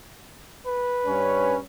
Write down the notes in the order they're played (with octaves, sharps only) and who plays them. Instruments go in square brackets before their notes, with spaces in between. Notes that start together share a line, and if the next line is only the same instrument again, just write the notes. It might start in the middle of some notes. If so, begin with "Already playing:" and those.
[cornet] B4
[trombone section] G2 C#4